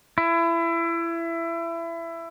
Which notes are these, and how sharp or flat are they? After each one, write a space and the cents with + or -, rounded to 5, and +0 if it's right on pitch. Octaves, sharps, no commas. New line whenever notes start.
E4 +25